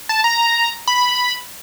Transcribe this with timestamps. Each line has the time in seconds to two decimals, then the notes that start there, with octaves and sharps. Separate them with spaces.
0.09 A5
0.24 A#5
0.88 B5